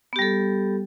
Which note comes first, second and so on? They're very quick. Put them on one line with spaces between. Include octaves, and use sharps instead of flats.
B3 G4 G3 A4